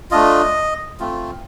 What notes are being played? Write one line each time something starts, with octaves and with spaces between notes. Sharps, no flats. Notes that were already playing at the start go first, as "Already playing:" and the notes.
A3 D4 F4 D#5
A3 C4 F4